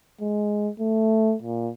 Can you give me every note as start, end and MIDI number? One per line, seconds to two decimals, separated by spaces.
0.21 0.69 56
0.80 1.34 57
1.42 1.70 46